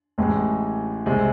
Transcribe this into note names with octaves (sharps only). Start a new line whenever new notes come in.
A1 A2 G#3
C2 C3 G#3